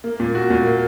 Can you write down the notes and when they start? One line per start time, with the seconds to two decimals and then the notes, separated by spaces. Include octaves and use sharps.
0.04 A#3
0.20 A#2
0.35 F#4
0.50 A#2
0.66 A#3